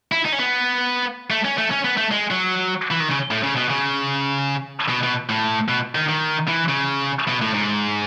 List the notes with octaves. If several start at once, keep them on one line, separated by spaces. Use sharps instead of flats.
E4
D#4
C#4
B3
A3
C#4
A3
C#4
B3
A3
G#3
F#3
E3
D#3
C#3
A2
C#3
B2
C#3
B2
B2
A2
B2
D#3
D#3
E3
C#3
B2
A2
G#2